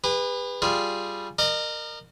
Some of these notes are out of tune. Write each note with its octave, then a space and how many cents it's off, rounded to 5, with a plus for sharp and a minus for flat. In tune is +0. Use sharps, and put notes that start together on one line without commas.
G#4 -45 B4 +0
G3 +0 F4 +0 G#4 +0
A#4 -10 D#5 -40